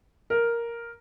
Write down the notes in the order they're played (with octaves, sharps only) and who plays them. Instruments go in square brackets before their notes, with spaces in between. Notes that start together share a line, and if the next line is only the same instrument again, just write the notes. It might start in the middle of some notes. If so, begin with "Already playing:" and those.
[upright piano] A#4